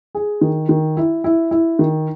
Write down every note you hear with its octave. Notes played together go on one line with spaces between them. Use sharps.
G#4
D#3
D#3
E4
E4
E4
D#3